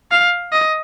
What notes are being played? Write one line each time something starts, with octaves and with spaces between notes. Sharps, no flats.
F5
D#5